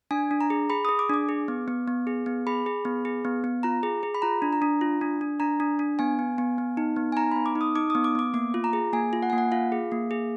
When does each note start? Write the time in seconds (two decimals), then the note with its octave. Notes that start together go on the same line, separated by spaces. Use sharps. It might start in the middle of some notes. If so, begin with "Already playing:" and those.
0.11 D4 G#5
0.31 D4
0.41 A#5
0.50 G#4
0.70 G#4 B5
0.85 G#4 D#6
0.99 D6
1.10 D4 D6
1.29 G#4
1.48 B3
1.68 B3
1.88 B3
2.07 G#4
2.26 B3
2.47 G#4 B5
2.66 G#4
2.85 B3
3.05 G#4
3.25 B3
3.44 B3
3.63 F4 A#5
3.83 G#4
4.03 G#4
4.14 B5
4.22 F4 A#5
4.42 D4
4.53 A#5
4.62 D4
4.81 F4
5.01 D4
5.21 D4
5.40 D4 A#5
5.60 D4
5.79 D4
5.99 B3 G#5
6.19 B3
6.38 B3
6.58 B3
6.77 D#4
6.96 B3
7.12 G#5
7.16 D#4 A#5
7.32 B3 B5
7.46 D6
7.55 D#4
7.61 D#6
7.75 D#4 D6
7.90 B3 D#6
8.04 D6
8.15 B3 D6
8.34 A#3 D6
8.54 F4
8.64 A#5
8.73 G#4
8.93 A#3 G#5
9.13 F4
9.23 F#5
9.30 G#5
9.33 A#3
9.38 F#5
9.52 F4 F5
9.72 G#4
9.92 A#3
10.11 G#4